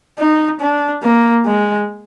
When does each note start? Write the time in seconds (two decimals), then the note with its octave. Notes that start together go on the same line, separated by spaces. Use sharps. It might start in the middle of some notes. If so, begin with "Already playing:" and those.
0.19 D#4
0.60 D4
1.03 A#3
1.46 G#3